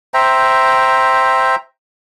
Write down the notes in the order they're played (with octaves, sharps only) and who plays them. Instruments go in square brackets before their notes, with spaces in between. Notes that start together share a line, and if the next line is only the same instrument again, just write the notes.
[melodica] C5 E5 G5 A#5